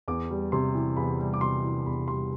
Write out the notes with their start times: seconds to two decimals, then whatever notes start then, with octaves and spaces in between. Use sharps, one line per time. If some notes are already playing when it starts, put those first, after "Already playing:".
0.08 E2 D6
0.30 G3
0.52 C3 C6
0.75 E3
0.97 E2 B5
1.19 G3
1.34 D6
1.41 C3 C6
1.64 E3
1.86 E2 B5
2.08 G3 C6